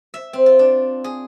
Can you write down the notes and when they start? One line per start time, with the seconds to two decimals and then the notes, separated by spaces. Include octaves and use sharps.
0.14 E5
0.33 C4
0.46 F4
0.59 D4
1.04 G#4